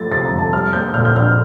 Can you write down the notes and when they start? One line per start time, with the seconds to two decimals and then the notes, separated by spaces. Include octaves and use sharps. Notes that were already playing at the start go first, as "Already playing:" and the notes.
Already playing: F3 A3 A6
0.11 C3 A6
0.25 A#5
0.32 F2
0.38 A5
0.53 G3 F6
0.73 A#3 G6
0.94 A#2 F6
1.05 G6
1.15 A#1 F6